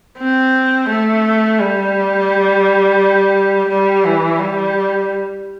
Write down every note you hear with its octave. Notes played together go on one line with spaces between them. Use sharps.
C4
A3
G3
G3
E3
G3